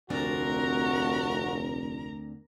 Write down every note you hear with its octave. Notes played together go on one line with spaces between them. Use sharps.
F1 D2 C4 D4 F#4 A#4 A#5